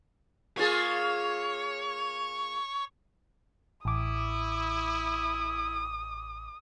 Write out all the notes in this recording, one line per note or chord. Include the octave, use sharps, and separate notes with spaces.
A#3 F4 G#4 C#5
A1 E4 D6 D#6